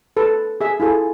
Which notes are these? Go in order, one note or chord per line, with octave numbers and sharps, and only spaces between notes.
A4 B4
G#4 E5
E4 F4 G#4 A4